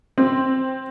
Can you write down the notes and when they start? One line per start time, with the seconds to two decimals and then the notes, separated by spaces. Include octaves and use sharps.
0.18 C4